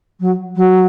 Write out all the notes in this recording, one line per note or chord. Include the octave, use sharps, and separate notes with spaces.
F#3
F#3